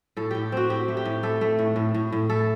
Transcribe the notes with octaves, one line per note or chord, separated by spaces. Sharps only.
A2 A4
A2 G4
C4 F#4
A2 G4
A3
G4
A2
A3 A4
A3
A2
A2
A2
A2
A3 A4